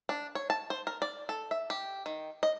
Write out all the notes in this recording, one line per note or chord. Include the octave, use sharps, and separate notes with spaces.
D4
C#5
A5
C5
A#4
D5
A4
E5
G4
D#3
D#5